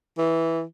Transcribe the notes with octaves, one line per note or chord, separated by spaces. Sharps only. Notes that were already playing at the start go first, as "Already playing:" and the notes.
E3